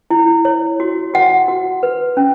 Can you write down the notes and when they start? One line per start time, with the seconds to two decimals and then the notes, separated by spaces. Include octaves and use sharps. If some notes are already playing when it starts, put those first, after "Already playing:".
0.10 E4
0.45 C#5
0.80 F#4
1.14 F#4 F#5
1.48 F#4
1.83 B4
2.17 C#4